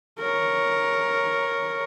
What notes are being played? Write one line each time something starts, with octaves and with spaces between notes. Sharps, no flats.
A#4 C#5